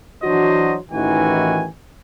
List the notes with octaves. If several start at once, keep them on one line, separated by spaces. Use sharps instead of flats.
E3 F#3 D4 F#4 C5 D#5
A1 D#3 E3 D#4 F#4 G#5